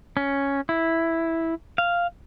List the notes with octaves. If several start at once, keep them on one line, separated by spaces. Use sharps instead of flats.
C#4
E4
F5